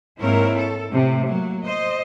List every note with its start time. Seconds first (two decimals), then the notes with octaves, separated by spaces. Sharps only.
0.21 G#2 A#3 C4 E4 A#4 C#5
0.57 A4
0.89 A2 C3
1.27 F#3 A#3
1.65 C5 D#5